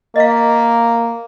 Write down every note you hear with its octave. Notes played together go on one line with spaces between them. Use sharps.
A#3 D#5 F5